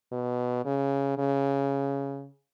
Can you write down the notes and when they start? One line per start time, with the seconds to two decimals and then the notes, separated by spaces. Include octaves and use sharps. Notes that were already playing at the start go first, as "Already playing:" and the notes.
0.12 B2
0.65 C#3
1.18 C#3